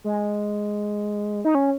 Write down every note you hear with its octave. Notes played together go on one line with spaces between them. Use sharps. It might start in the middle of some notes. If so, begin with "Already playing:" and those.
G#3
D#4
C#4